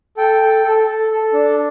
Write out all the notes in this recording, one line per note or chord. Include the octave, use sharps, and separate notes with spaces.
A4 G5
A4
A4
A4
A4
D4